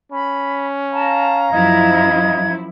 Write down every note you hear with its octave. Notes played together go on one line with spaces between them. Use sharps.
C#4 B5
F5 A5 A#5
F#2 F3 E4 D#5 G#6